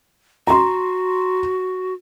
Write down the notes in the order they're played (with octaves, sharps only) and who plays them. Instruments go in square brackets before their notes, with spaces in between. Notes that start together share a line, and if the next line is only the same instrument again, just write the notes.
[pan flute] F#4 [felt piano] A#5 C6